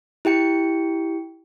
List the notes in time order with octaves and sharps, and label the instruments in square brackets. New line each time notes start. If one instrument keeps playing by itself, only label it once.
[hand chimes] E4 G4 G5 C#7